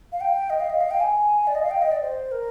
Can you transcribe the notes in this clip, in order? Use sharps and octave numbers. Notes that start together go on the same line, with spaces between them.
F5
G5
D#5
F5
D#5
F5
G5
G#5
D5
D#5
F5
G5
D#5
D5
C5
A#4